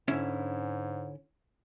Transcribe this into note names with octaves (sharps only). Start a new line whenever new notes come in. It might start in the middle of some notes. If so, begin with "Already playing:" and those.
G#2 D3 C#4 E4